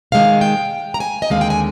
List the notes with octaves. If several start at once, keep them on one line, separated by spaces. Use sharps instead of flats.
C3 D#3 G#3 F5
G5
A#5
G#5
D#5
D#2 D3 G#3 C4 F5
G5
G#5